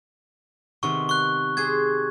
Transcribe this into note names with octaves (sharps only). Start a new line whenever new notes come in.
C3 D#3 B3 C#6
C#6 F#6
G4 G#4 C5 G#6